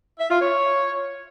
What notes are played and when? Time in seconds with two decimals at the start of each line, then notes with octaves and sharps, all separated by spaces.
0.19 E5
0.30 F4
0.40 C#5